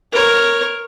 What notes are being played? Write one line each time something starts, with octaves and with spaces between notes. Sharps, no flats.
A#4 C#5